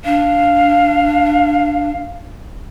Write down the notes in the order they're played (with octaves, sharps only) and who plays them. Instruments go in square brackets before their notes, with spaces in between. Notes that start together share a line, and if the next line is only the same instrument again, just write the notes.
[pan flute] D4 [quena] F5